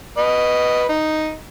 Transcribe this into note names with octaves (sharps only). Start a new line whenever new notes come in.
B4 D#5
D#4